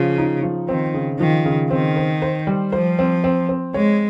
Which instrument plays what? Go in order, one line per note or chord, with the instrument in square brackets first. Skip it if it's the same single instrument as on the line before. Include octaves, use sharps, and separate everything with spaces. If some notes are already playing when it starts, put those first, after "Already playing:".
Already playing: [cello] C#3 [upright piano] F3
[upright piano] D#4
F3
[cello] D#3 [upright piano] C4
[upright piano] C#3
[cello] D#3 [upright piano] F3
[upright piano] C#3
[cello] D#3 [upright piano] C4
[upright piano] C5
C5
G3
[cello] F3 [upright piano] C5
[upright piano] C4
C4
C4
[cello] G#3 [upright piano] C#5